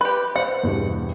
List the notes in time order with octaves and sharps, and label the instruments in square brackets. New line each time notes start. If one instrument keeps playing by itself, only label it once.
[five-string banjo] G4 B4
[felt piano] C5 [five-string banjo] F#5
[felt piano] E2 G2 B2